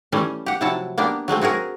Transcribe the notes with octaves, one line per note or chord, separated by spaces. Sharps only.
E3 G3 A3 C#4
G4 F#5
C3 F3 F#3 E4 F#5 A5
A#3 B3 D4 G4
F#3 G#3 A3 C4
C4 F#4 G#4 A#4